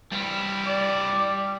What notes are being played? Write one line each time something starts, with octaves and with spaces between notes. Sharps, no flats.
G2 G3 E4
D5